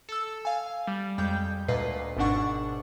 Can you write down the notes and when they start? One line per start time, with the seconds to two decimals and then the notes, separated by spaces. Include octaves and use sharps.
0.09 A4 E6
0.45 F5 G#5
0.87 G3
1.18 F2 G3 G#3 G5 G6
1.68 D2 A#2 B4 D#5 C7
2.17 G#1 G#2 B2 D4 F#5 C#6